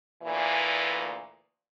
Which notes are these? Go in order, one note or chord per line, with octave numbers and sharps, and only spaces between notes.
D2 A#2 E3